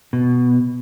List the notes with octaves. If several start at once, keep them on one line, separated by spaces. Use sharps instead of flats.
B2